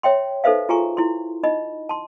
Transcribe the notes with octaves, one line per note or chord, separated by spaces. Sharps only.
C#5 E5 G5 C6
D#4 A4 B4 C5 E5 F5
F4 F#4 G#4 G#5 A#5 C#6
E4 C6
D#4 D#5 B5
A5 C6